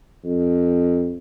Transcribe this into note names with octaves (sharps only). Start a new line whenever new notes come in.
F2